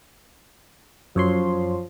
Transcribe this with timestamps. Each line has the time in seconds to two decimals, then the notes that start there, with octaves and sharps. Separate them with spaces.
1.16 F#2 F3 C#5 C6